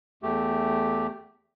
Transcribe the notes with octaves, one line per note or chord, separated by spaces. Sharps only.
E2 A3 G4